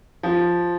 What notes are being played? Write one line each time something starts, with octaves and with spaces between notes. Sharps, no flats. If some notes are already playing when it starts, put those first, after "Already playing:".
F3